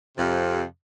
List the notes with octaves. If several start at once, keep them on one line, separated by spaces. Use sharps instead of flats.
F2 C3